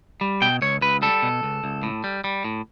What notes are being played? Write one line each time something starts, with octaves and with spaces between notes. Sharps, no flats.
G3
B2 G5
C#2 C#5
C#2 B4
G3 A4
B2
C#2
C#2
A2
G3
G3
A2